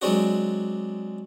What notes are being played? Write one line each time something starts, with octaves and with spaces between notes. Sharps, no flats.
F#3 G#3 C4 D4 F#4